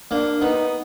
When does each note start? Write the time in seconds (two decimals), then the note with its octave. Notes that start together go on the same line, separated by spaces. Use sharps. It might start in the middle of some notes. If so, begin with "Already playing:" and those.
0.11 A#3 D4
0.41 B3 D#4